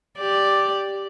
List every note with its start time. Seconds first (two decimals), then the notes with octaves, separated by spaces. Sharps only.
0.19 G4 D5